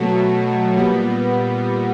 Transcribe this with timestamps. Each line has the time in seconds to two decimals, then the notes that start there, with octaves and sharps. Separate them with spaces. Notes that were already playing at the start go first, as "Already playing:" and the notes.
Already playing: B2 F#3 A3
0.76 A#2 G3 B3